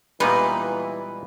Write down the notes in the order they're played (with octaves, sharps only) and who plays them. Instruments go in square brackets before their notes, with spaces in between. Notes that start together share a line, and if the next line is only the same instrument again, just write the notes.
[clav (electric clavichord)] A#2 G3 [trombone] E3 [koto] G#3 B3 D#4 [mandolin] B4